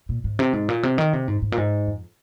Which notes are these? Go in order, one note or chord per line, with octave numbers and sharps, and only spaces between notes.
A#2
G#2
C3
G#2
A#2
C3
D#3
C3
G#2
G#2
A#2
G#2
F2